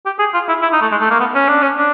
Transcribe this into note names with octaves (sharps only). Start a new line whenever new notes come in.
G4
G#4
F4
E4
E4
D#4
A3
G#3
A3
A#3
B3
C#4
D4
C#4
D4